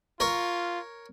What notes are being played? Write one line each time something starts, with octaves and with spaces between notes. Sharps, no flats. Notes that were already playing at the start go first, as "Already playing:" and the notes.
F4 A#4 C#5